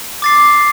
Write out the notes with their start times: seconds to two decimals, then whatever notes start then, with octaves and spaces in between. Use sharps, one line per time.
0.22 D6 A6 C7